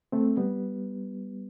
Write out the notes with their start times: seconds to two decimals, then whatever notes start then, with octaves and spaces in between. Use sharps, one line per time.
0.12 A3 C4
0.37 G3 B3